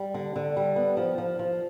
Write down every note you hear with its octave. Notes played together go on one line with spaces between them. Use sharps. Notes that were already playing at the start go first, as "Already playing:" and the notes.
Already playing: G3
D3
D3
G3
B3
F3
F3
F3